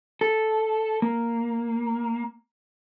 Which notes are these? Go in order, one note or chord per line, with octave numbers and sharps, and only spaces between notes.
A4
A#3